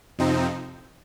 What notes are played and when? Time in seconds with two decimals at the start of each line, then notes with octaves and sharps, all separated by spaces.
0.19 F2 C3 F3 C4 D#4